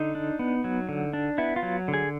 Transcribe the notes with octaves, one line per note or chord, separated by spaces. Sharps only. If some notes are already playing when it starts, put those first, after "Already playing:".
Already playing: D3 D#4
D4
B3
F#3
D3
D4
B3 E4
F4
F#3
D3
G#4